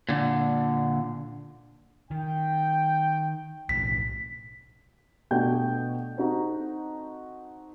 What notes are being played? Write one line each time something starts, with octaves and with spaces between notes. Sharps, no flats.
A#2 D3
D#3 G5
B1 A2 B6
B2 A3 D4 F#4 G5 G6
C4 D#4 F#4 A4 A#5